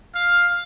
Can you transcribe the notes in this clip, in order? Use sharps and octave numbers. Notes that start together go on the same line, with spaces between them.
F5